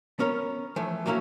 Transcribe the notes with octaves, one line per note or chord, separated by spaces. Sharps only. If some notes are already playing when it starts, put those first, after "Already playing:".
B3 C#4 A#4 C#5
E3 F3 A3
E3 F#3 A#3 C#4 E4